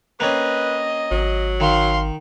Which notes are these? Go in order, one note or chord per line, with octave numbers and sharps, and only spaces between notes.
A#3 C4 C#4 B4 D#5
G#1 F#3
D#3 F5 C6